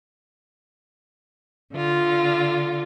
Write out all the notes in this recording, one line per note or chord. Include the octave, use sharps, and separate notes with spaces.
D3 F4